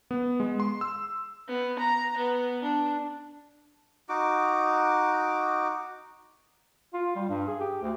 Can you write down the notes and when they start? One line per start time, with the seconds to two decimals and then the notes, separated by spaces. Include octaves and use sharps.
0.11 B3
0.40 G#3
0.60 C6
0.81 E6
1.48 B3
1.79 A#5
2.17 B3
2.62 D4
4.09 D#4 F#4 D6
6.94 F4
7.16 G3
7.29 G2
7.48 G#4
7.61 G4
7.82 D2